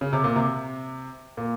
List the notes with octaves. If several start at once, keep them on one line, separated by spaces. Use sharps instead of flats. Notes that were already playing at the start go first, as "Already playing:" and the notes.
C#3
C3
A#2
C3
A#2